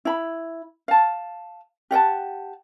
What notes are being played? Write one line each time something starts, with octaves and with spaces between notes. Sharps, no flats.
E4 B5
F5 A5
G4 F#5 G5 A5